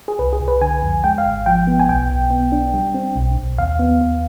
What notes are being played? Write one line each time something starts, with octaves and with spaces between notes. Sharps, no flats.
G#4
C2 B4
G#4
C2
B4
D3 G#5
F2
G#3 G5
F5
G#1
F3 G5
B3
G#5
B1 G5
B1
B3
D4
G3
C4
B1
B1
D#2 F5
B3
D#2